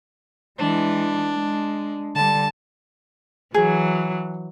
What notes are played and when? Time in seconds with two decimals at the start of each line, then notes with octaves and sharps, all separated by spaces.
0.59 E3 G#3 D4
1.35 G#3
2.15 D3 G3 A5
3.54 E3 F#3 G#4